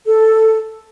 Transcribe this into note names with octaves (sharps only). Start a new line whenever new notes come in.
A4